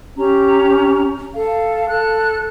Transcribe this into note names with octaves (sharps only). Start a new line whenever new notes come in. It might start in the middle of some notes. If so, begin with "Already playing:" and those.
C#4 G4 A#5
A4 F5
A4 F#6